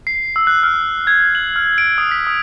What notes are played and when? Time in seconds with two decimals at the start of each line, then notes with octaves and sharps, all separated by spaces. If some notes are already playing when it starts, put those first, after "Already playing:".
0.07 C7
0.36 E6
0.47 F#6
0.63 F6
1.07 G#6
1.35 F#7
1.56 F6
1.78 D7
1.98 D#6
2.11 B6
2.27 D#6